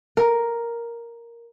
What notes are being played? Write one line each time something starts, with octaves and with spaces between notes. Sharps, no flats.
A#4